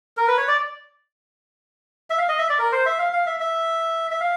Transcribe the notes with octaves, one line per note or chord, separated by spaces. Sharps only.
A#4
B4
C#5
D5
E5
F5
D#5
E5
D5
A#4
C5
E5
F5
F5
E5
E5
E5
F5